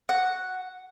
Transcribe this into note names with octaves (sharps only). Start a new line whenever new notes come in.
F#4 F#5